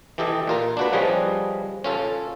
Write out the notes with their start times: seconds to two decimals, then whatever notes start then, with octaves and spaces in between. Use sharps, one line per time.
0.18 E3 G4 A4 D#5
0.47 A#2 F4 A#4
0.77 D4 F#4 B4
0.93 F3 G3 C#4 G#4 B4 D#5
1.84 C#4 F4 A4